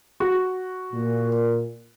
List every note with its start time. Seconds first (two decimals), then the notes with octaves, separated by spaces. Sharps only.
0.20 F#4
0.93 A#2